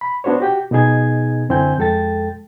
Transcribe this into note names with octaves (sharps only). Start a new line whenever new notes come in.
B5
B3 D4 F#4 C5 C#5
F#4 G4 G5
B2 B3 D#4 G#4 G#6
F#2 D3 C4 E4 G#5 G6
F2 G#3 A4 G5 A6